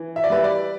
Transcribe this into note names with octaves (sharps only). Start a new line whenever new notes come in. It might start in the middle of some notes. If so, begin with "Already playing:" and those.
Already playing: E3
E5
D5
G3 B4 E5
D5